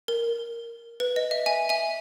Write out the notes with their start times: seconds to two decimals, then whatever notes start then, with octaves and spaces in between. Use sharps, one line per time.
0.08 A#4
1.00 B4
1.16 D#5
1.31 E5
1.46 E5 G#5
1.69 E5 G#5